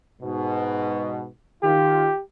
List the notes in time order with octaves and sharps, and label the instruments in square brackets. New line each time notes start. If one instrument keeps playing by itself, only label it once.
[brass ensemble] G#2 B2
[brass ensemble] D#3 F4 [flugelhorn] G4